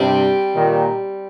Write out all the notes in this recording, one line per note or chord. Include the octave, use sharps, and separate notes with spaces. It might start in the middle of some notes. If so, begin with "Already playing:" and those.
Already playing: G2 C3 G3 C4
A#2 D#3